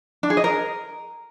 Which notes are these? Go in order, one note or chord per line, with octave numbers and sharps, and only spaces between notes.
D4
G#4
D#5
A#4